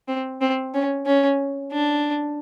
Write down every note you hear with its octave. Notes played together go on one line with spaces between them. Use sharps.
C4
C4
C#4
C#4
D4